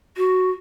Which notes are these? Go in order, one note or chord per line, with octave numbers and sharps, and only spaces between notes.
F#4